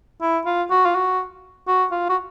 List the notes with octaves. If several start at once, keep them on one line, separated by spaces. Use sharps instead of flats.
E4
F4
F#4
F4
F#4
F#4
F4
F#4